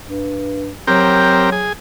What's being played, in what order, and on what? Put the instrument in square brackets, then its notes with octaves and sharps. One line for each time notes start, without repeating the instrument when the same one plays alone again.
[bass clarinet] G2
[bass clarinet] F#3 [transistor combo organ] C4 G4 A#4
[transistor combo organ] G#4